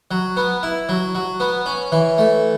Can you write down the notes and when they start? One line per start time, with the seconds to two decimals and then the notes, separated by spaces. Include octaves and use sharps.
0.11 F#3
0.37 B3
0.63 E4
0.89 F#3
1.15 F#3
1.40 B3
1.66 C#4
1.92 E3
2.18 A3